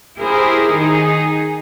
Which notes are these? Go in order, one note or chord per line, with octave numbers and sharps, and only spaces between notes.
E4 G4 G#4 A#4 C5
D#3 D#4 G#4